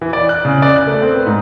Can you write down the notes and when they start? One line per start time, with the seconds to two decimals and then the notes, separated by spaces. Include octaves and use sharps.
0.01 E3
0.13 D5
0.29 F#6
0.45 C#3
0.62 D5
0.76 F#6
0.87 A3
1.02 C4
1.14 B4
1.26 G#2